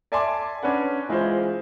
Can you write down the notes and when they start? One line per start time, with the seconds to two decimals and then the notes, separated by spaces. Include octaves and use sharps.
0.12 D5 E5 G#5 A5 C6 D6
0.63 C#4 D4 B4 F#5
1.09 E3 G#3 E4 F4 C5